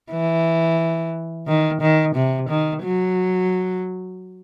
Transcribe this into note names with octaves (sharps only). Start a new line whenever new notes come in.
E3
D#3
D#3
C3
D#3
F#3